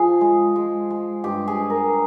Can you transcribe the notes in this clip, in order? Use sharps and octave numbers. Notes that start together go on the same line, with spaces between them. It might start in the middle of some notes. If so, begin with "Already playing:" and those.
Already playing: F3 G#4
G#3
G#3
G#3
G2 G4
G#4
G2
A#4